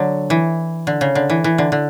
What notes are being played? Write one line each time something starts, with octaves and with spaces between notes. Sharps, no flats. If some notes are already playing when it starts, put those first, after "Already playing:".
Already playing: D3 F#3
E3
D3
C#3
D3
E3
E3
D3
D3